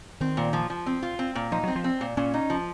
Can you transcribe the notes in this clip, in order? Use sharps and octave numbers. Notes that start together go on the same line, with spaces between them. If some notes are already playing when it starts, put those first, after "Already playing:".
D#3 C4
A#2
F3
F3
C4
F4
C4
A#2
F3 D#4
F#3 C4
F3
C4
A#2
A#2 C#4
D#4
F3